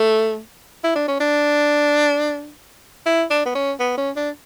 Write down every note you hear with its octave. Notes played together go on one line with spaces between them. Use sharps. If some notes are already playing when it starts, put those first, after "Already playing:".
Already playing: A3
E4
D4
C#4
D4
E4
D4
B3
C#4
B3
C#4
D4